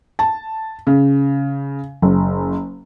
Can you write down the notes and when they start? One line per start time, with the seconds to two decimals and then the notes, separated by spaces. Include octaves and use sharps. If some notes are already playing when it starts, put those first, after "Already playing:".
0.19 A5
0.87 C#3
2.02 F#1